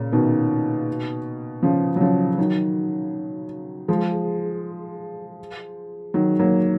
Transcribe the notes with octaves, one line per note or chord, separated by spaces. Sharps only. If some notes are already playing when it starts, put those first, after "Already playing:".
Already playing: A#2 C#3
B2 D#3
C#3 F3
F#3
C#3 F3
D#3 F#3
F3 G#3
D#3 F#3
F#3 A#3